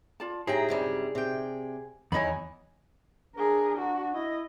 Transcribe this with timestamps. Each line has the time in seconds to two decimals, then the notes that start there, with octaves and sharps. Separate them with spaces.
0.20 F4 D5 A5
0.47 A2 D#4 G4 G#4 G5 A#5
0.69 F#2 C3 G3
1.15 C3 G5
2.12 E2 F#3 D#4 E4 D#5 G#5 B5
3.36 D4 G#4 A#4
3.78 F#4
4.14 E4 D#5